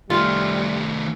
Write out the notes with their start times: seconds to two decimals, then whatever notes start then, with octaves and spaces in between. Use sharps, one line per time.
0.10 D#3 G3 A3 F4